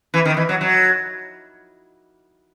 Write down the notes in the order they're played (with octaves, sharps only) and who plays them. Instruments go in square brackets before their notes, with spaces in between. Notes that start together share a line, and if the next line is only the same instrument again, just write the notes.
[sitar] E3
D#3
E3
F#3
F#3